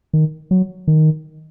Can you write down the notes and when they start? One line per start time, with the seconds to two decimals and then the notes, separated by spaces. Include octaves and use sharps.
0.13 D#3
0.51 F#3
0.88 D#3